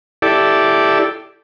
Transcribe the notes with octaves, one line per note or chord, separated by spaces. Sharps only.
E4 G4 A4 D5